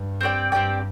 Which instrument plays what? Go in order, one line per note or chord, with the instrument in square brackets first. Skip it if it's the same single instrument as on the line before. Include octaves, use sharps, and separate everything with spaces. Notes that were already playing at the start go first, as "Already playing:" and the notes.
Already playing: [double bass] G2
[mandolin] C4 G4 D5 G5
[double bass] G2 [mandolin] C4 G4 D5 G5